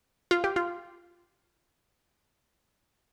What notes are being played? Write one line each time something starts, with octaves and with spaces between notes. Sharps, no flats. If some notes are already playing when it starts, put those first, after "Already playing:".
F4
G4
F4